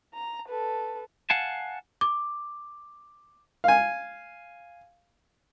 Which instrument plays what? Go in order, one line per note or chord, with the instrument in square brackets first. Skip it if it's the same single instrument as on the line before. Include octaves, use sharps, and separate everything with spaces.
[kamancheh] A#5
A4 B4
[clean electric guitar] F5 F#5 G#5 A5
[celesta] D6
[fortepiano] F5 G#5